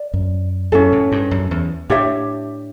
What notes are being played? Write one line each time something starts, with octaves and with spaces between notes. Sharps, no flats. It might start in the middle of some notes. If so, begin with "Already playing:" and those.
Already playing: D5
F#2
F#2 C#4 E4 A4
A2
G2
F#2
E2
A2 D4 G4 C#5 E5